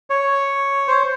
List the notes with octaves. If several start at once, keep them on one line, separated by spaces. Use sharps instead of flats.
C#5
C5